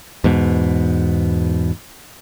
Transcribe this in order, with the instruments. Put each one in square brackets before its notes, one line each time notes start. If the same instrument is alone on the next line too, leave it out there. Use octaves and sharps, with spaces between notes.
[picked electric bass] E2 G#2 B2